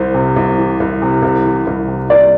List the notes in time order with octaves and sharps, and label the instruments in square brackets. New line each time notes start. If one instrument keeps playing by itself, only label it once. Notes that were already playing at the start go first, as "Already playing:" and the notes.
Already playing: [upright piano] C2 [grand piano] C5
[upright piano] C3
C2
E3
C2
C3
C2
E3
C2
C3
[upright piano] C2 [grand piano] D5